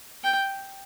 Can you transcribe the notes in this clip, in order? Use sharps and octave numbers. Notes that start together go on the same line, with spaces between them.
G5